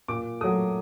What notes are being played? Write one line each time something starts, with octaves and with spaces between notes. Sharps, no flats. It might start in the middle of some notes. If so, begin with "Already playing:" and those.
A#2 D6
F#3 A3 D#6